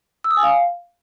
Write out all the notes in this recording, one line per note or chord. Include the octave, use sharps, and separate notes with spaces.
E6
D#6
G#5
F5